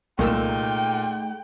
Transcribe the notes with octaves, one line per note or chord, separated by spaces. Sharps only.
C2 A#2 G#3 A3 D#4 A#4 G5 E6